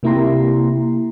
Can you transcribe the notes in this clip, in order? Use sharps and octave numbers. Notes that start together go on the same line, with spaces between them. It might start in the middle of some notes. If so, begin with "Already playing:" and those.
C3 A#3 E4 G4 A#5 C6